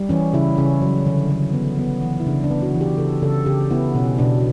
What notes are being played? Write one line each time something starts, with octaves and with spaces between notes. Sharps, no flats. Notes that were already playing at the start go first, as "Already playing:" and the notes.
Already playing: G3
E3 C#4
C#3 E4
C#3 C#4
F#3
D3
D3
B3
B3
E3
E4
C#3 D4
D4
B3
F#4
E3
G4
C#3 A4
C#3 A4
C#3 G4
B3 E4
B2 C#4
B2 D4